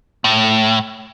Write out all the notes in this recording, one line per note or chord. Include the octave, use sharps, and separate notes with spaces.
A2